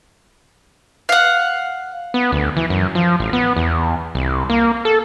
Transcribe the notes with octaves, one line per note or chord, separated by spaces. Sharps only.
F5 F#5
B3
D2
E3
F#2
F3
A1
B3
E2
C2
A#3
A4